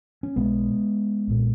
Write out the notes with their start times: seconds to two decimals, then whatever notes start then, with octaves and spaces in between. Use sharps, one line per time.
0.23 C#4
0.36 B1 B2 G#3 B3
1.27 B1 A#2